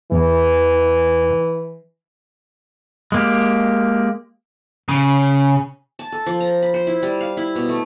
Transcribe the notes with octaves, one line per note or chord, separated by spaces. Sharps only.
E2 E3
G#3 A#3 G4
C#3
A5
A4
F3
A#5
B5
C5
E4
G3
F5
E4
B2
A3